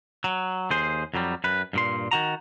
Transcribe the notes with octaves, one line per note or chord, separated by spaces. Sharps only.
F#3
D#2 G#4 C5
F2 F#3 G3
F#2 B4
G2 A#2 C6
D#3 F#4 A#5